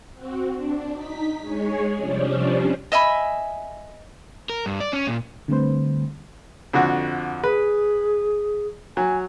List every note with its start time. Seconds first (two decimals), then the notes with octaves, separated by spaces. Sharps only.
0.14 C4 F#4
0.52 D4
0.92 D#4 B6
1.40 G#3 G#4 C#5
1.97 C3 F3 G3 C#4 D4
2.92 D#5 E5 G#5 B5
4.49 A#4
4.66 G2
4.80 D5
4.93 C#4
5.07 A#2
5.48 D3 G3 A3 C4 B4 C5
6.73 F2 D3 F#4
7.44 G#4 B4
8.97 F#3 G#5